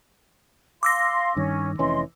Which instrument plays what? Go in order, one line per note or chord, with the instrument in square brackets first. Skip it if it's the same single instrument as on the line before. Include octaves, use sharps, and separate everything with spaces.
[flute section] F5 C6 [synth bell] D6 E6 A#6
[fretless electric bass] G2 D#3 [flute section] C#4
[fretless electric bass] F1 E3 C#4 [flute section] D#5 C6